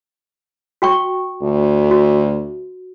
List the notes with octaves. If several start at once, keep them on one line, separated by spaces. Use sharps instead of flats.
F#4 G5 C#6
D2
F#4